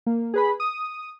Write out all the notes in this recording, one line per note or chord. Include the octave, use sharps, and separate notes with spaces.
A#3
G#4 B4 B5
D#6